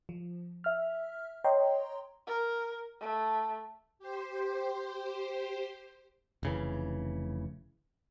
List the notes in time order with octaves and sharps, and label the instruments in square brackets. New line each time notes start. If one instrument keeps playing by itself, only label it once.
[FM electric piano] F3
E5 F6
C#5 D#5 G5 A#5 C6
[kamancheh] A#4
A3
[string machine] G4 C5
[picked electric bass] F1 C#3 E3